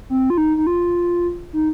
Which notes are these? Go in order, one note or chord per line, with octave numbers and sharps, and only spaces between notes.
C4
F4
D#4
D#4
F4
D#4